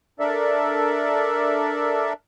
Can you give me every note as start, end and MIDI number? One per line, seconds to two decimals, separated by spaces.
0.20 2.13 62
0.20 2.13 69
0.20 2.13 70
0.20 2.13 74
0.20 2.13 76